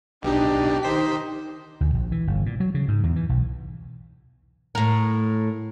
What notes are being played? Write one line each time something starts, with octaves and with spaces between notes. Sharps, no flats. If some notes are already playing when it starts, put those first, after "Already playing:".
B1 B2 D4 D#4 G4
D#3 D#4 C5 B6
D2
A#1
E3
G1
A#2
F#3
C#3
G#2
E2
E3
B1
A2 A#4